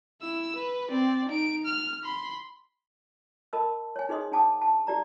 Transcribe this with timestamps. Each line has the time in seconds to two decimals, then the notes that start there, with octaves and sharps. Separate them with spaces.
0.22 E4 E6
0.56 B4
0.90 C4 D5
1.29 D#4 D7
1.66 F6
2.03 B5 C6
3.53 A#4 D#5 A5 B5 E6
3.96 C#5 G#5
4.09 D#4 G#4 C5 D#5 C6 D#6
4.32 D4 G5 A5 D6 D#6
4.61 A5
4.87 D#4 G4 D5 A#5